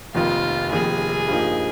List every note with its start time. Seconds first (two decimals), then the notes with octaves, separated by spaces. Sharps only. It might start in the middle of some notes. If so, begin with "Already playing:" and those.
0.14 F1 F2 D#3 A#3 F4
0.72 F1 F2 D#3 A#3 G#4
1.28 G2 F3 A#3 D#4